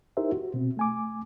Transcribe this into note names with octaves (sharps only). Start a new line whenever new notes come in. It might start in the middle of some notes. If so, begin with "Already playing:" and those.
D#4 E4 G4 A#4 C5 E5
F#4
B2 C4
A3 G#5 D6